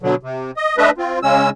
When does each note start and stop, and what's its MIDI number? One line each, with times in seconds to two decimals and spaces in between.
0.02 0.15 47
0.02 0.15 50
0.02 0.15 54
0.23 0.51 48
0.57 0.76 75
0.78 0.90 57
0.78 0.90 62
0.78 0.90 71
0.78 0.90 75
0.78 0.90 76
0.98 1.19 60
0.98 1.19 65
1.23 1.50 49
1.23 1.50 56
1.23 1.50 61
1.23 1.50 88